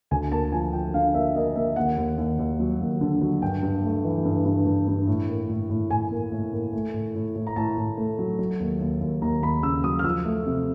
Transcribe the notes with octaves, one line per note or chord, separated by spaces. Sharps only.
D2 G#5
A#3 A5
F3 G#5
F3 G5
D3 F5
A#3 E5
A#3 D#5
A#3 E5
D#2 F#5
D#2
D#2
D#2
F#3
D#2
D3
F#3
G2 G5
G2
A3
E3
G2
G2
G2
G2
A2
A#3
A2
A2
A2 G#5
A#3
A2
A#3
A3
A2
A2
A2
A#5
A2 A5
A2
A3
F#3
F#3
D#2
D#2
D#2
D#2 A#5
D#2 B5
C#3 E6
F#3 D#6
F6
F3 E6
A3
C3